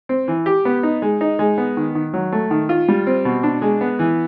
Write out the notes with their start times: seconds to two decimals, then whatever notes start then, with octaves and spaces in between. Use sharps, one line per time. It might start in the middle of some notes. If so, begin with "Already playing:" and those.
0.09 C4
0.28 E3
0.46 G4
0.65 B3
0.83 D#4
1.02 G#3
1.21 D#4
1.39 G#3
1.58 B3
1.77 D#3
1.95 D#3
2.14 F#3
2.32 A3
2.51 D#3
2.69 F4
2.88 G3
3.07 C4
3.25 B2
3.43 D4
3.62 G#3
3.81 B3
3.99 E3